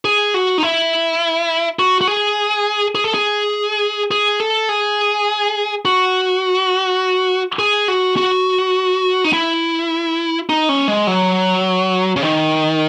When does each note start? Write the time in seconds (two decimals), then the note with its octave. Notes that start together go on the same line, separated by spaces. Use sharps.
0.05 G#4
0.34 F#4
0.58 D#4
0.63 E4
1.79 F#4
2.01 F#4
2.08 G#4
2.95 G#4
3.04 A4
3.14 G#4
4.11 G#4
4.40 A4
4.69 G#4
5.85 F#4
7.59 G#4
7.88 F#4
8.17 F#4
9.24 D#4
9.33 E4
10.49 D#4
10.69 C#4
10.88 G#3
11.07 F#3
12.16 C#3
12.23 D#3